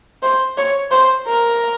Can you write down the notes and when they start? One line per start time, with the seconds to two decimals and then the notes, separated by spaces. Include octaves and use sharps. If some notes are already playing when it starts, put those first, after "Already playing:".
0.23 C5
0.58 C#5
0.91 C5
1.27 A#4